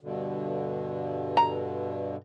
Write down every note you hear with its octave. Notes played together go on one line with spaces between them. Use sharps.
G2 B2 D3
A#5